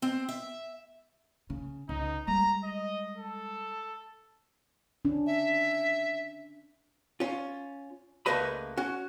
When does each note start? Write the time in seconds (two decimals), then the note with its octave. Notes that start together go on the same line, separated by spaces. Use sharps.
0.02 C4
0.29 E5
1.50 C#3
1.89 C#2 D#4
2.27 G3 G#3 A#5
2.64 D#5
3.18 A4
5.05 C#4 D4
5.26 E5
7.20 C#4 F4
8.26 C#2 A3 A#3 B4 D#5 B5
8.77 C#4 F#4